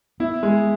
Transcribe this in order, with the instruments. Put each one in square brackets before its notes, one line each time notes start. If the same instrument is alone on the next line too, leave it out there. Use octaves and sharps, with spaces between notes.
[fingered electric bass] B3 [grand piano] E4
[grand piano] G#3